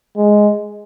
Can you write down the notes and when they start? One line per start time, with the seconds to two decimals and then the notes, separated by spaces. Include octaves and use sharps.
0.17 G#3